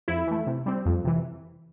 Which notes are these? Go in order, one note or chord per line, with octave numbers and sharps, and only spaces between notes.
F2 E4
E3 A3
C3
G3 C4
F2
C3 E3